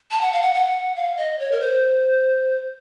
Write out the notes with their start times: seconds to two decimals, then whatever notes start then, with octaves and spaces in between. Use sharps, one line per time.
0.11 A5
0.21 F#5
0.33 F5
0.42 F#5
0.54 F#5
0.96 F5
1.17 D#5
1.39 C#5
1.52 A#4
1.61 C5